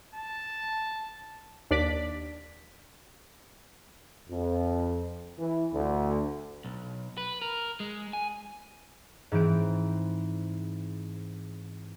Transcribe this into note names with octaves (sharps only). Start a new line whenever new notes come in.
A5
D#2 D4 D5 B6
F2
E3
D2
B1
B4
A#4
G#3
G#5
G#2 E3 C4 D7